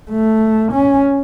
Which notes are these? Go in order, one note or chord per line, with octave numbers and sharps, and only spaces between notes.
A3
C#4